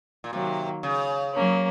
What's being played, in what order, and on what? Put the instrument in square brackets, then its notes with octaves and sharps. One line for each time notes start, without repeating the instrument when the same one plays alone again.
[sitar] A#2
[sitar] C3 [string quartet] D#3 F#3 A#3
[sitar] C#3
[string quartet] F#3 A#3 C#4